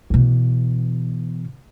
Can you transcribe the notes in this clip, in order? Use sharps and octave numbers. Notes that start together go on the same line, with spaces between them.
B2 E3